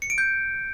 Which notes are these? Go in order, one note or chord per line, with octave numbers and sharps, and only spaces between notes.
C#7
D7
G6